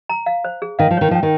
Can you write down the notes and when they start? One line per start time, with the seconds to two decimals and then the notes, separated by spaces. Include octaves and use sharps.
0.09 A#5
0.26 F5
0.44 C5
0.62 G#4
0.79 D#3 F5
0.91 F3
0.97 D#3 C#5
1.11 F3 G5
1.23 D#3